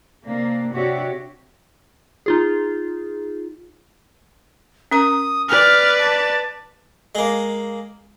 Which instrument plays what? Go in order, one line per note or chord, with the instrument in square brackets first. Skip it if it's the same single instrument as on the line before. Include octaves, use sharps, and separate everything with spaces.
[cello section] C3 A#3 D4
C3 D4 F#4 G4 C#5 E5
[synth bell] D#4 F4 G#4
[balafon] C#4 A#4 A#5 [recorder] D#6
[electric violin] B4 D5 [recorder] F6
[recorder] A5
[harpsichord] G#3 A#3